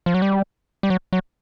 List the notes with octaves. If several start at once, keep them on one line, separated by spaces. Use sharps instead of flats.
F3
F#3
G3
G3
F#3
F#3